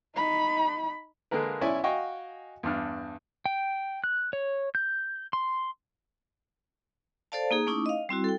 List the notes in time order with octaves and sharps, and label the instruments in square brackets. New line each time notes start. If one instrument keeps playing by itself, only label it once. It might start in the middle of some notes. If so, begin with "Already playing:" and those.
[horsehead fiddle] D#4 B5
[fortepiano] D3 G#3 A#3 A#4 B4
B1 C#4 E4 D5 E5 G#5
F#4 D#5 F5 G5 G#5 C#6
E2 G2 D4 F6
[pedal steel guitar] G5
F#6
C#5
G6
C6
[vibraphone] A4 C5 D5 F5 A5
A#3 D#4 G#4
A3 C#4 D#4 E4 D6 D#6
D#5 F5
G3 C4 E4 F#4
A4 G5